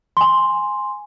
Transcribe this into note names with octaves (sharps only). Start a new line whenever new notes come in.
G#5 C6